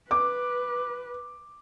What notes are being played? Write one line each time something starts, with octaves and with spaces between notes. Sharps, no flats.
B4 D6